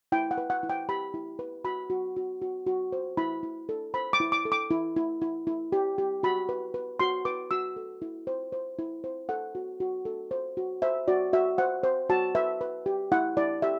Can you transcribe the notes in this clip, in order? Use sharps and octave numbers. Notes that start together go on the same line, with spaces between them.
E4 G5
F#5
B4
F#5
E4
G5
G4 B5
E4
B4
F#4 B5
F#4
F#4
F#4
F#4
C5
E4 B5
E4
A4
C5 B5
D6
E4
D6
A4
D6
E4
E4
E4
E4
G4
G4
F#4 B5
B4
B4
F#4 C6
B4 D6
F#4 E6
A4
E4
C5
C5
E4
C5
A4 F#5
F#4
F#4
A4
C5
F#4
C5 E5
F#4 D5
F#4 E5
C5 F#5
C5
F#4 A5
B4 E5
B4
G4
E4 F#5
E4 D5
G4 E5